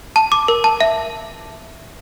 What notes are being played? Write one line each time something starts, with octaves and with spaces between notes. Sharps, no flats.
A5
D6
A#4
A5
E5